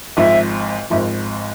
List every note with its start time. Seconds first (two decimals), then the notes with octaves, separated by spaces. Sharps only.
0.17 G#1 G#2 F3 E5
0.90 G#1 G#2 F3 E5